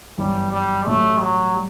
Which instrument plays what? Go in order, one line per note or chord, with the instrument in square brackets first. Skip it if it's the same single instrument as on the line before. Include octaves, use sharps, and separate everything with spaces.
[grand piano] G1 F#2 E3 [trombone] G3
[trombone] G3
[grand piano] A1 A2 F#3 [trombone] A3
[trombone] F#3
[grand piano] G3